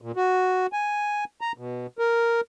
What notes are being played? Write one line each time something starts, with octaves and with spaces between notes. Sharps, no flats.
A#2
F#4
G#5
A#5
B2
A#4